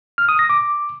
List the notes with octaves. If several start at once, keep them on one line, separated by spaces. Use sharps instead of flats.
F6
D#6
A#6
D6